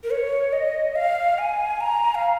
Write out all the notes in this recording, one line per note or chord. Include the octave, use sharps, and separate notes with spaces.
A#4
C#5
D#5
F5
G#5
A#5
F5